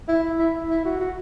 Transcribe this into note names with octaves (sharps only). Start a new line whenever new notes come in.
E4
E4
E4
F#4
F#4